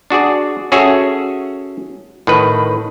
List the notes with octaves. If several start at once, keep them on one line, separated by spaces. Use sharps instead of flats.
D4 F#4 G#4 D5
C#4 F#4 G#4 A4 C#5 E5
A2 D#3 B4